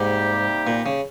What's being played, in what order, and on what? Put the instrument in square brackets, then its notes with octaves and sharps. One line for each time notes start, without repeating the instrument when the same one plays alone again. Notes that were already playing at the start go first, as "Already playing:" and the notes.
Already playing: [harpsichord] G#2 [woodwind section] C3 G3 A#3 D#4 G4
[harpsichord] A#2
C#3